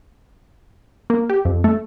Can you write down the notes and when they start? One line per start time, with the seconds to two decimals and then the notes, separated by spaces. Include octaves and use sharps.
1.10 A#3
1.30 G4
1.45 F2
1.64 A3